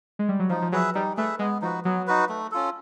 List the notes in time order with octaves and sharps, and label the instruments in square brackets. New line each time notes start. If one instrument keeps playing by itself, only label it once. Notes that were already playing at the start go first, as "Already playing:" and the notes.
[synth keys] G#3
G3
F#3
[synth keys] F3 [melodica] D#4
[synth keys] F3
[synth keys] F#3 [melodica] G#4 B4 E5
[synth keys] G3 [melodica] D#4
[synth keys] A3 [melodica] G#4 B4 E5
[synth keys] G#3 [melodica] B3
[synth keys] F3 [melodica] D#4 F#4 B4
[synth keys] F#3 [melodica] B3
[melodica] D#4 F#4 B4
A3
C#4 F4 A4